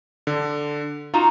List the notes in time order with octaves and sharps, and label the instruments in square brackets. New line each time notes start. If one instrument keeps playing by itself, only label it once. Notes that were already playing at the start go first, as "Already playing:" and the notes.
[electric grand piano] D3
[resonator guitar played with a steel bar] D#4 F#4 A#5 [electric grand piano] F4